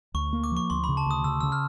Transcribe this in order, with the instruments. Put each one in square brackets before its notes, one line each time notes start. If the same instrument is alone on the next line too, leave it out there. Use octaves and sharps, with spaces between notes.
[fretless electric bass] D2 [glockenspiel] C#6
[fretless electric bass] A#3
[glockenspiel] D6
[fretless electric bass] F3 [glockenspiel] C#6
[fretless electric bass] D2 [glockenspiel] C6
[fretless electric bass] C#3 [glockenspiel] B5
[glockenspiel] A5
[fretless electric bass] D2 [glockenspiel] D#6
[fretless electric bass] C#3 [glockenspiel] E6
[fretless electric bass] C#3 [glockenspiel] E6
[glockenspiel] F6